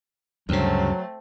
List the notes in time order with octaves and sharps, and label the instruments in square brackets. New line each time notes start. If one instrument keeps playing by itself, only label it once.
[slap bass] D2 C#3 [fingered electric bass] G2 [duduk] F#3 [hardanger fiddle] A3 C4